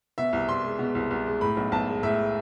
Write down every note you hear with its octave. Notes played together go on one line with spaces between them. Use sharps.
B2 E5
C2
C2 C6
G#3
B2
C2
C2
G#3
A2 B5
B1
B1 A5
G#3
A2 E5